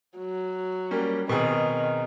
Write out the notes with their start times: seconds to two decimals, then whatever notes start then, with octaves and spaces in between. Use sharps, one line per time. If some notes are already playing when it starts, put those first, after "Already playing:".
0.18 F#3
0.91 G3 A#3 C#4
1.29 B2 D#3 C4 G#4